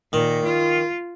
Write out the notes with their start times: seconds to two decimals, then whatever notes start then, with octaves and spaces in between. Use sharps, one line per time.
0.13 A#2 D#3
0.45 F4